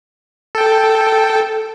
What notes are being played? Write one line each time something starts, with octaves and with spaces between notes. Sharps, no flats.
A4 G5